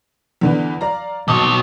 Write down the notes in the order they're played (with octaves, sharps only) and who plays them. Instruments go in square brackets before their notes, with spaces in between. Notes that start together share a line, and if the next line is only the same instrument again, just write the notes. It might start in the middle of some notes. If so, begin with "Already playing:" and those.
[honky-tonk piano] E2 D3 E3
D5 F5 A#5
[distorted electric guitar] B1 C#5 [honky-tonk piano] A5 D6 D#6